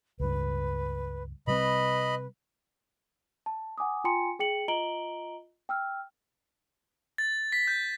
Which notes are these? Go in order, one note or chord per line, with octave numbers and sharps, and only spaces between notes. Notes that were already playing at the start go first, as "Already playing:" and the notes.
C#2 G2 B4
C3 G3 C4 B4 D#5 B5
A5
F#5 G#5 D6 D#6
F4 G5 G#5 A#5 C6 C#7
G#4 G5 C#7 F#7
F4 D#5 A#5 D7 F#7 G7
G5 E6 F6
A6
B6
G6